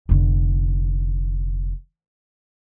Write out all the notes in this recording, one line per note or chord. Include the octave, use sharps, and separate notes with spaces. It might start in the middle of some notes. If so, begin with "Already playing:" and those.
F1 D3